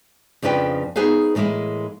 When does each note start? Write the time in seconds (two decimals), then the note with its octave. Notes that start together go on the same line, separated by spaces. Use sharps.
0.42 F2 C#3 F3 D4 B4 G5
0.96 B3 D#4 G#4 B4 C5 F5
1.35 A2 E3 G#3 A#3 E4